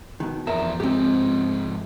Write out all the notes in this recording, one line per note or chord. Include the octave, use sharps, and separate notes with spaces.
B2 D#3
E2 F3 A#4 E5 A#5
G#2 F3 C4 G4